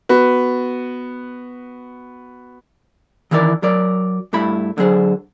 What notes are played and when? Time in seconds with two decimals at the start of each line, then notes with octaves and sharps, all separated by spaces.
0.09 B3 F#4 B4
3.31 D#3 E3 E4 A#4 D5
3.63 F#3 A#4 D5
4.33 G2 A3 E4 B5
4.78 D3 F#3 G#4 C5